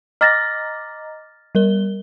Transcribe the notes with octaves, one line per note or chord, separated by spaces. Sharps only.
D#5 A#5 D6 F6 A6 A#6
G3 A#4 G7